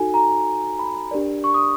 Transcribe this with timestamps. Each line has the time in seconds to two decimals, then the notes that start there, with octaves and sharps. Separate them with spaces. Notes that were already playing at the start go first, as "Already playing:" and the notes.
Already playing: D#4 F#4 A4 G#5
0.14 A#5
0.79 B5
1.11 D4 G4 A#4 D5
1.44 C#6
1.54 D#6